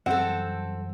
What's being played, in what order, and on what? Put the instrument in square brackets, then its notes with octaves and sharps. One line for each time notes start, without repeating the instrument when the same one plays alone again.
[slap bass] F#2 E3 G3 [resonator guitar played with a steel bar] C4 A4 [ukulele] F#5